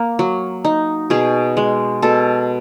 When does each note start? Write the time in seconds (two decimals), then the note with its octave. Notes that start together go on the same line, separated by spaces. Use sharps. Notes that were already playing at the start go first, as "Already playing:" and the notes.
Already playing: A#3
0.19 F#3
0.65 D#4
1.10 B2 G#4
1.57 G#3
2.02 B2 A4